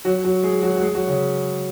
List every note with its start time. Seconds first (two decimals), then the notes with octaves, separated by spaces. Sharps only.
0.05 F#3 F#4
0.25 F#3 F#4
0.43 G#3 G#4
0.63 F#3 F#4
0.77 F#4
0.81 G#3 G#4
0.94 F#3 F#4
1.07 C#3 C#4